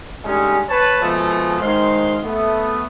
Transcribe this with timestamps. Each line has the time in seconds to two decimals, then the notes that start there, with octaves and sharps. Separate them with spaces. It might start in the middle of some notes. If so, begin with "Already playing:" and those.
0.24 D3 G3 G#3 C#4 D#4
0.68 B4 C#5 A5
1.02 B2 F3 G#3 A3 B3
1.61 D#3 G#3 C5 F5 C6
2.23 A3 B3